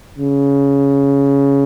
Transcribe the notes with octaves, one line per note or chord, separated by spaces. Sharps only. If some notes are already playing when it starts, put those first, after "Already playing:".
C#3